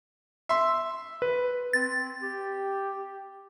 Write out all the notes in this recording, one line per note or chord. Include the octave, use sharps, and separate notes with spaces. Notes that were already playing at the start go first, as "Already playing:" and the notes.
E5 C6
B4
C4 A6
G4